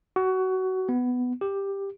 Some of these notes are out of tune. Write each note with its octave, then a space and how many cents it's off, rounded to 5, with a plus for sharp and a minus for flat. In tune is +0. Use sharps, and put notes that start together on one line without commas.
F#4 +20
B3 +10
G4 +10